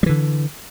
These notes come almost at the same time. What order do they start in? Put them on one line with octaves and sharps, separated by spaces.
G3 E3 D3